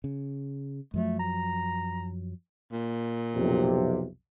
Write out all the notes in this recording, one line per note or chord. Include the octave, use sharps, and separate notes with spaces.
C#3
F#2 F3 F#3 A3
A#5
A#2
B1 F2 C3